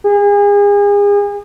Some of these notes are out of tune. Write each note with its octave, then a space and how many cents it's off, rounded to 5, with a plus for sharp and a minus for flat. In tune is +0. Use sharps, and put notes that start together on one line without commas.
G#4 -35